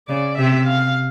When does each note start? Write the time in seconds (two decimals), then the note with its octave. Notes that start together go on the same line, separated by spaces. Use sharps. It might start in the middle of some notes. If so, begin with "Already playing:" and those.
0.08 C#3 D5
0.37 C3 E5
0.67 F5